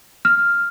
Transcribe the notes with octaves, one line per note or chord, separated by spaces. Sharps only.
F6